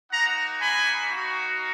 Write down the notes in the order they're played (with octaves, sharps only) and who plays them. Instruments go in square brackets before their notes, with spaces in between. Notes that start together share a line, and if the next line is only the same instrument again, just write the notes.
[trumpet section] A#3 D#4 F#4 F#5 A#5
G#5 B5
A#3 D#4 F#4